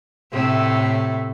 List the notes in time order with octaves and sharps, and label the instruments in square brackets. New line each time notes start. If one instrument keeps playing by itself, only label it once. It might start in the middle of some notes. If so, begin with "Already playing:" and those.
[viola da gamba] A2 C3 A3